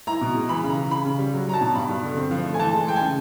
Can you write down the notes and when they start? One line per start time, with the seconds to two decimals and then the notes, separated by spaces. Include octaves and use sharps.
0.07 E4 A#5
0.21 B2
0.35 G#3
0.49 E3 B5
0.63 C#3
0.70 A#5
0.77 C#3
0.91 C#3 B5
1.05 C#3
1.18 G3
1.34 F#3
1.46 F#3 A#5
1.54 A5
1.61 B2
1.75 G2 B5
1.89 G2
2.03 D3
2.16 C4
2.31 F3
2.44 A3
2.54 G#5
2.59 E3 A5
2.73 G#3
2.80 G#5
2.87 G#3 G5
2.96 G#5
3.01 C#3